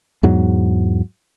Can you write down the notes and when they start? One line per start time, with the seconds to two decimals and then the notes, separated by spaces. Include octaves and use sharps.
0.23 E2 G#2 F#3